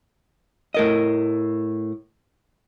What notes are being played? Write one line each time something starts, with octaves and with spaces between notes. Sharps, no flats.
A2 A#4 D#5